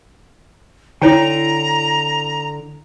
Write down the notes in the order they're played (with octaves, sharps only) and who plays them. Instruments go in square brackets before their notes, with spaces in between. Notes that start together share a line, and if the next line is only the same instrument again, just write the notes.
[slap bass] D3 [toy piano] E4 C#5 G5 [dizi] A#5